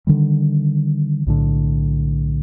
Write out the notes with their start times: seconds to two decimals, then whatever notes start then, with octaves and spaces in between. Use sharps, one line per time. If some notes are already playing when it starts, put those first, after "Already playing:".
0.07 D3 D#3 G3
1.26 B1 A2 D3